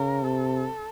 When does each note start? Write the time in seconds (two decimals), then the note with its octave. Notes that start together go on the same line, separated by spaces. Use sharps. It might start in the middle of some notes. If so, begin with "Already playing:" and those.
Already playing: C#3 A#4
0.23 C3 A4